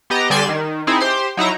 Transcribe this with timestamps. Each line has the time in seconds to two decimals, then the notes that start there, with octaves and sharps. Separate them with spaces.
0.10 B3 G4 D#5 A#5
0.30 D3 G3 D5 G#5 C6 E7
0.49 D#3
0.87 C4 D#4 E4 G#4
1.00 G4 C5 C6
1.37 F#3 D#4 E4 A#5